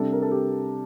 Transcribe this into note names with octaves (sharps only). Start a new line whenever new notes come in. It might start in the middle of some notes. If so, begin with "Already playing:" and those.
Already playing: C3 G3 D4 A4
A#4
A4
G4